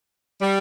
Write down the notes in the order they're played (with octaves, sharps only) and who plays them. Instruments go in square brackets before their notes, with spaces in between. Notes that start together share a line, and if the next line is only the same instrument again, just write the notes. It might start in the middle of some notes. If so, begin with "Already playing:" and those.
[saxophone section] G3